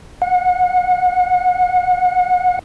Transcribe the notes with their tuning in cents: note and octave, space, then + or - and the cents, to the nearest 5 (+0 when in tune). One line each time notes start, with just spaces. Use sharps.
F#5 -30